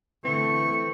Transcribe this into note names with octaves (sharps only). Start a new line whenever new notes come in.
D3 E3 A3 C4 C#6